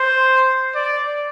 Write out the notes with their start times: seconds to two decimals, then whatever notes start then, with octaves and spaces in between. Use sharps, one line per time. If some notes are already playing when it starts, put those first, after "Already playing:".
Already playing: C5
0.75 D5